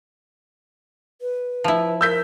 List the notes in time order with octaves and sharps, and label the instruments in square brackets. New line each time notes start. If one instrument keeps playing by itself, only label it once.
[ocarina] B4
[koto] F3 E4
[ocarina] A#4 [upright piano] E6 G6 B6